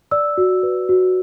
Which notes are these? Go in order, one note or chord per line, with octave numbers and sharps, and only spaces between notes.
D5 E6
F#4
B4
F#4